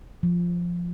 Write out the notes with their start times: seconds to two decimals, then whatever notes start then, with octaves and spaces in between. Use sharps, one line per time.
0.23 F3